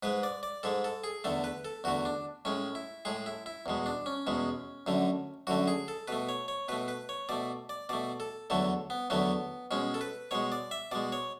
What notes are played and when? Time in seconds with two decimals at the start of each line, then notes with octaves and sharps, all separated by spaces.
0.03 G#2 G#3 B4
0.23 D5
0.43 D5
0.63 G#2 G#3 A4
0.84 A4
1.04 G#4
1.24 E2 D3 A3 A4
1.44 B4
1.65 A4
1.84 E2 D3 A3 F#4
2.05 D4
2.45 A2 G#3 C#4
2.75 E4
3.05 A2 G#3 G#4
3.26 E4
3.46 E4
3.66 E2 B2 G#3
3.86 D4
4.06 C#4
4.27 E2 B2 G#3
4.87 F#2 D3 A3
5.47 F#2 D3 A3 F#4
5.68 G#4
5.88 A4
6.08 B2 A3 B4
6.29 C#5
6.48 C#5
6.68 B2 A3 B4
6.88 B4
7.09 C#5
7.29 B2 A3 D5
7.69 D5
7.89 B2 A3 D5
8.20 A4
8.50 E2 D3 F#3 A3 A4
8.90 B3
9.10 E2 D3 F#3 A3 B3
9.71 B2 G#3 C#4
9.94 A4
10.01 B4
10.31 B2 G#3 C#5
10.52 D5
10.71 E5
10.91 B2 G#3 D5
11.12 C#5